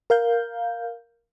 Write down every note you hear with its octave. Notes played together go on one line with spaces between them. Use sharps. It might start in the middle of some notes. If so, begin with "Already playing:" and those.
A#4 F5 G6